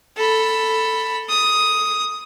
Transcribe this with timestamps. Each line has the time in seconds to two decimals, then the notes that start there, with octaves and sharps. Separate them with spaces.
0.17 A4 B5
1.29 D#6